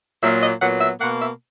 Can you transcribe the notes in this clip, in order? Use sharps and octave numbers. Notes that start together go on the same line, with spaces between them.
A#2 F#3 A#3 E5
D#5
A#2 F#3 B3 F#5
E5
B2 A#3 F#5
E5